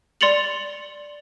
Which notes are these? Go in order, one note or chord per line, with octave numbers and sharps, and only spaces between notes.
D5 C6 A6 C#7 F7 F#7